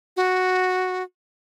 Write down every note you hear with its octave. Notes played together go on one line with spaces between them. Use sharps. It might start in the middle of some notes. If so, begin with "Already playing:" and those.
F#4